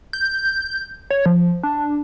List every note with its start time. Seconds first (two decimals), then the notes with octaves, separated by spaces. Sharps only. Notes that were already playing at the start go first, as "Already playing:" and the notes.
0.13 G6
1.11 C#5
1.26 F3
1.63 D4